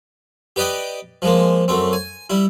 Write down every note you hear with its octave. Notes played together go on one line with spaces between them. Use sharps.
G4 B4 D5 D#5 G5
F3 G#3 A#3
F#2 A3 C4
G#5
G3 E4